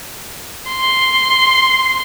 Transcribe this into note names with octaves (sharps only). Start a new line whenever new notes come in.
C6